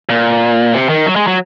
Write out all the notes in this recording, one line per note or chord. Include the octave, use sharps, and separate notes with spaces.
A#2
C3
D#3
F#3
G#3
F#3